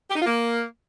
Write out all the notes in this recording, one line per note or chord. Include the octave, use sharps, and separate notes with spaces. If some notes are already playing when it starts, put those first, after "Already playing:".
G4
D#4
F4
A#3